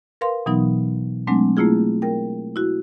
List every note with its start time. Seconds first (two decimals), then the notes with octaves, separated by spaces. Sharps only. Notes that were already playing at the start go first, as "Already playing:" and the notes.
0.21 A#4 B4 F5 C6
0.46 B2 E3 F#3 B3 D#4
1.27 F#3 G#3 A3 C4 D4
1.57 A3 A#3 E4 F4 G#4
2.02 A#4 G5
2.56 E4 F#4